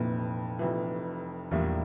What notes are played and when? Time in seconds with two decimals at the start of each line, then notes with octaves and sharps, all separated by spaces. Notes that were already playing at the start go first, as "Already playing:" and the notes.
Already playing: F1 F2 A#2 E3
0.59 F1 F2 E3
1.51 A#1 E2 A2 G3 A#3 E4